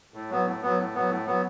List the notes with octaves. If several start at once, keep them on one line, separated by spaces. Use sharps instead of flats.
A2
F#3 B3
A2
F#3 B3
A2
F#3 B3
A2
F#3 B3